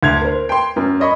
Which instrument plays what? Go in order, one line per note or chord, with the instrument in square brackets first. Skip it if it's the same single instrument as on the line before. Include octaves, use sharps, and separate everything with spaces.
[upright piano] D2 G#6 F7
A#4 C5
G5 C6
F#2
C#5 D#5 B5 C#6